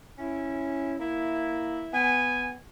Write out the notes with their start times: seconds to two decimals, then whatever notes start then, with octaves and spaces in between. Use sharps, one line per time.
0.19 C#4 E4
1.00 A#3 E4
1.94 B3 G#5